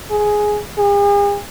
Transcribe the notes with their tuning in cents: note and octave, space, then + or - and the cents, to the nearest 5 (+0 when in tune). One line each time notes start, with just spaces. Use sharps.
G#4 +5
G#4 -45